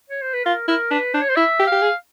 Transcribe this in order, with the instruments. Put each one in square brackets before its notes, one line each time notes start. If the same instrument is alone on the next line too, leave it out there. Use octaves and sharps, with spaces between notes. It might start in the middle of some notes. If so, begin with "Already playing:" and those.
[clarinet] C#5
C5
B4
[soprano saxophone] F4 [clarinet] A#4
[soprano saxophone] E4 [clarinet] A#4
[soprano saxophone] D4 [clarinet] B4
[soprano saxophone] D4 [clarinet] C5
[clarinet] C#5
C5
[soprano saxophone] E4 [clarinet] E5
[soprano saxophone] G4
[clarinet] F5
[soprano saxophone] G4
G#4